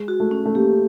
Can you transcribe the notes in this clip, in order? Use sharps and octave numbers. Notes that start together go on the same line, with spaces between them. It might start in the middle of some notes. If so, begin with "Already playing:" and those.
Already playing: G#3
F#4
A3
C#4
A3
A#3 G4